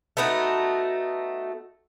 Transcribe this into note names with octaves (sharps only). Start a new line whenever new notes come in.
A3 B3 D#4 F#4